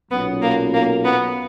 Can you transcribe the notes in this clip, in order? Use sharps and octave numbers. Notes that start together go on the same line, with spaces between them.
B1 A#2 F#3 B3 C#4
A#3
A#3
B3